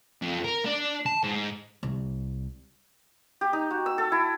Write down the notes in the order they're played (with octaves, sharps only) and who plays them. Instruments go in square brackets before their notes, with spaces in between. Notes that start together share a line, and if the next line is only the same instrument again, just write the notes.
[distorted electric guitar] F2
A#4
D4
A5
G#2
[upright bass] C2
[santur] G4
D#4
F#4
E6
A4
E4